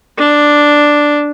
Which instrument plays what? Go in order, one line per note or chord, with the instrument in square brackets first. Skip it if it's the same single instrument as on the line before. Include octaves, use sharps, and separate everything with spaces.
[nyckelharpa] D4